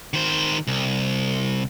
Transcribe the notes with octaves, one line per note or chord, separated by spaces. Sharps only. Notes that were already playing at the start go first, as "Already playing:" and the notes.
D#3 C5
C2